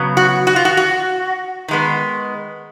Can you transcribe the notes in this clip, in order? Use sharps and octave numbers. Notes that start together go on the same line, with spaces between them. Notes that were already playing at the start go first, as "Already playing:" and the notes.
Already playing: C#3 F#3 B3
F#4
F#4
F4
F#4
F#4
D#3 G#3 B3